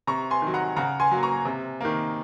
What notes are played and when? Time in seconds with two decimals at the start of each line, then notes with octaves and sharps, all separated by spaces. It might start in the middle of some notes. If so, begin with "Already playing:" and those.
0.07 C3 A#5 C#6
0.31 G#5 C6
0.42 D#3 F#3
0.54 F#5 A#5
0.76 C#3 F#5 A#5
1.00 G#5 C6
1.11 F#3 A#3
1.23 A#5 C#6
1.45 C3
1.81 D#3 A#3